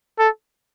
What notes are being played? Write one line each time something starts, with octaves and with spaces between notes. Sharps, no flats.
A4